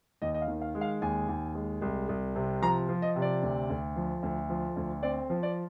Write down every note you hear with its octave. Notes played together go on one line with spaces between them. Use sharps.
D#2 D#5
D#5
F5
D#3
F5
G#3
F5
D#2 G#5
D#2
G#3
C2
C2
C3
F3 A#5
F3
D#5
C3
D5
D2
D2
F3
D2
F3
D2
C4 D5
F3
D5